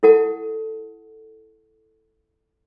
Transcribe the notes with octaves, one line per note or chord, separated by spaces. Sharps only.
E4 A4 F#5 A5